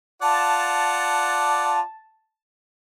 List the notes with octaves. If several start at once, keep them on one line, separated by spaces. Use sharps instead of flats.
F4 D5 F#5 A5